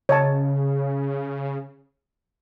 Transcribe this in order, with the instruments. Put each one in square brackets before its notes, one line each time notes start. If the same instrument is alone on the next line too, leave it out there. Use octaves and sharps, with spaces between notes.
[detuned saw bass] C#3 [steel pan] C#5 D#5 A5